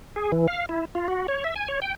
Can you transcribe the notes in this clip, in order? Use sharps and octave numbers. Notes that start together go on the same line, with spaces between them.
G#4
E3
F5
E4
F4
F#4
C#5
E5
G#5
C#5
G5